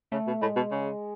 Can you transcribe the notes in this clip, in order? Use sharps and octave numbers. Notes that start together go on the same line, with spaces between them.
C#3 A3
B2
A2 G#3
B2
C#3